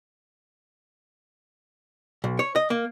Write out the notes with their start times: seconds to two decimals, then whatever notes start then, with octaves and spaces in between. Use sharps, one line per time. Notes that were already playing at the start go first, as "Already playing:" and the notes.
2.24 B1
2.39 C#5
2.56 D#5
2.70 A#3